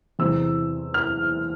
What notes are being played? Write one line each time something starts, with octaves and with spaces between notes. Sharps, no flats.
E2 C3 E3 G#3 E6
F6